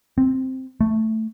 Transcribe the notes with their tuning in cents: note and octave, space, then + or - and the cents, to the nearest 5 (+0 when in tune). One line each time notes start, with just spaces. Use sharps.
C4 +0
A3 +5